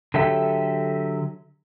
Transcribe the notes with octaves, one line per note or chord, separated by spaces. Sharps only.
D3 F#3 G4 A4 E5